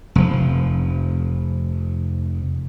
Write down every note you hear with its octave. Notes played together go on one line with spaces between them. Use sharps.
F1 F3